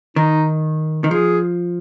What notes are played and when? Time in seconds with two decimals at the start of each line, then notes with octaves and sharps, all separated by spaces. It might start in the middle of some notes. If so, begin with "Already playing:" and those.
0.16 D#3 D#4
1.04 D#3
1.11 F3 G#4